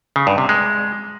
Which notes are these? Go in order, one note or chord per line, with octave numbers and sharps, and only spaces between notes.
C#3
G2
C3
G#3